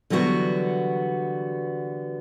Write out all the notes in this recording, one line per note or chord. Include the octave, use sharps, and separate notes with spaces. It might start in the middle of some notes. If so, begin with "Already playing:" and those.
D3 E3 F#3 G3 B3 F#4